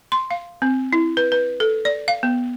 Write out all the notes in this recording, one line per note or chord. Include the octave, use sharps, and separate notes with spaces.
C6
F5
C4
E4
B4
B4
A4
D5
F5
B3